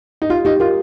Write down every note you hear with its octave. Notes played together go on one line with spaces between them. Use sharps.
D#4
F4 G4
D#4 G4
F4 A#4